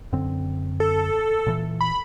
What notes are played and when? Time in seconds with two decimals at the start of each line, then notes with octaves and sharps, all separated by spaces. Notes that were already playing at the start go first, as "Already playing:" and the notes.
0.12 F#2 D3 C4
0.80 A4
1.47 A#2 E3
1.81 B5